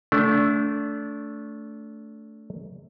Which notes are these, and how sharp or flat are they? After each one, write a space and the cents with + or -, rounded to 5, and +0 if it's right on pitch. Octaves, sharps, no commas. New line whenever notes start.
A3 +0 D4 -30